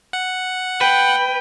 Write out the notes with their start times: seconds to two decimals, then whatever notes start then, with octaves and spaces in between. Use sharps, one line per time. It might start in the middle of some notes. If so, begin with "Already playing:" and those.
0.13 F#5
0.81 B4 G5